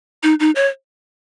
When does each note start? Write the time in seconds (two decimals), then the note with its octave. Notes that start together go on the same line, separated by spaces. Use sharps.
0.23 D#4
0.40 D#4
0.56 C#5